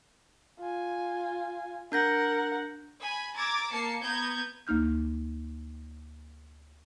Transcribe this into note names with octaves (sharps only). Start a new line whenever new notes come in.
F4 G#5
D4 A#4 F#5 G6 A#6
G#5 B5
A#5 D6 E6 G#6 A6
A#3 A5 C7 C#7
B3 A#5 G6 G#6
D2 A#3 D#4 F6 G6